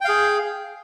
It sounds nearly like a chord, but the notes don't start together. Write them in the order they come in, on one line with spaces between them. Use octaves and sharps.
G5 F5 G#4